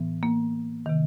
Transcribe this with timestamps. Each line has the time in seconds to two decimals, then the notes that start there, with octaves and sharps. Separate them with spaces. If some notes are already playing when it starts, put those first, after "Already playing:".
Already playing: A2 E3 B3
0.23 A#3
0.86 C3 D#3